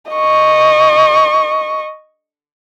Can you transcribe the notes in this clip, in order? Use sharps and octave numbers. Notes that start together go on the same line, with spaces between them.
D#5 C#6